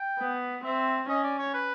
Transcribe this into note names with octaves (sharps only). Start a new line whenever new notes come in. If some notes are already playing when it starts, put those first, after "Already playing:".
Already playing: G5
B3
C4 E5
C#4 D#5
D5
C#5
B4